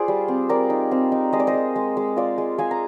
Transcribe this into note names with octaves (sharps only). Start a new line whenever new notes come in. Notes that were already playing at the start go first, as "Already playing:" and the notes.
Already playing: F4 G#4 C5 D5
G3
C4
C4 A#4 D5
D#4
C4
D#4
G#3 D#5
D5
C5 D#5
G#3
G#3
G#3
F4 D5 F5
G#3
G#3 F5 G#5
A#5